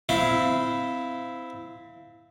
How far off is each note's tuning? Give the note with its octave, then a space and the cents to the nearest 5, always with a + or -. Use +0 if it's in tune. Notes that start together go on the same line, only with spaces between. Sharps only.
C4 -20 E4 +0 F5 +0